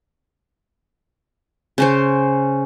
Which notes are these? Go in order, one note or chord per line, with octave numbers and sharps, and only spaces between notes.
C#3 C#4 C5